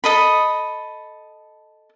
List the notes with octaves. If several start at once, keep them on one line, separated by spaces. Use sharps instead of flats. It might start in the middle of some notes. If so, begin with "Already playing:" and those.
A4 D#5 B5